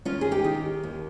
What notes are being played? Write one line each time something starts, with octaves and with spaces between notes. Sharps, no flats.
D#2 C#4 F4
G#4
D#4 G4
D#3
D#2